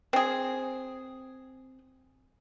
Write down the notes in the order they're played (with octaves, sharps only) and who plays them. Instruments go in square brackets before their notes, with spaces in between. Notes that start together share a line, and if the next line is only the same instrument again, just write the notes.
[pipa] C4 G#4